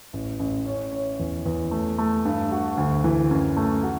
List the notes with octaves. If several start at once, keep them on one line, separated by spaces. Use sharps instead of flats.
A1
A1
C#4
C#4
E2
E2
A3
A3
G2
F#4
D2
E3
F#2
A3
F#4